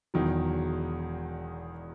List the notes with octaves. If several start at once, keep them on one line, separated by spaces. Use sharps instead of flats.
E1 E2 D#3 F#3